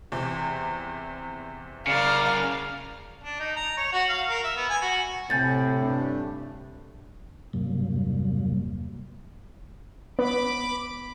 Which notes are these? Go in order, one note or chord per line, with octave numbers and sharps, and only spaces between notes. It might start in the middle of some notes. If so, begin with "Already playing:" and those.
E2 C3
C#3 A#4 D5 F5
D4
D#4
A#5
C#5
F#4
F5
A#4
E5
B3
G#5
F#4
A2 C3 G#5 G6 A6
G2 A3 D4
E2 G2 C3 F#3 G3 A#3
B3 B5 D6